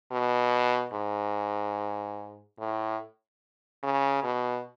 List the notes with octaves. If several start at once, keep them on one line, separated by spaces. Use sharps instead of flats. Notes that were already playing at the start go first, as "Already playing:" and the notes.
B2
G#2
A2
C#3
B2